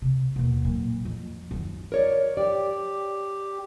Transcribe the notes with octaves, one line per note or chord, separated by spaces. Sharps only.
C3
D#2 B2
A#2 F#3
F2
F#2 D#3
A#4 C#5 D5
G4 D5